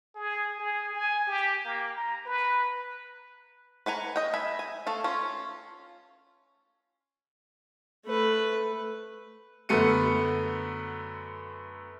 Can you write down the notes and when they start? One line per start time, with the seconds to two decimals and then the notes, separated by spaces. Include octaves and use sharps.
0.16 G#4
0.60 G#4
0.95 G#5
1.27 G4
1.65 A#3
1.97 A#5
2.26 B4
3.86 B4 F#5 G#5 A#5
4.16 D#5 G5
4.34 E5 G#5 B5
4.59 G#5
4.87 A3 A4 F5
5.04 C#4 F4
8.06 A3 B4
9.69 F#2 D3 A3 B3 C#7 D#7